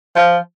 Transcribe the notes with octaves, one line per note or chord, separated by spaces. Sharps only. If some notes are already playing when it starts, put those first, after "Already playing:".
F3